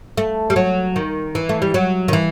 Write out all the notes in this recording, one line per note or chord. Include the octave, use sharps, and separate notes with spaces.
A3
G3
F#3
D#3
E3
A3
G3
F#3
D#3
E3